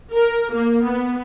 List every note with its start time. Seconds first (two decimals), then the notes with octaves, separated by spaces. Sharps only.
0.12 A#4
0.53 A#3
0.85 B3